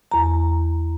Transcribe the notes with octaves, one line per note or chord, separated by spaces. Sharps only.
E2 A#5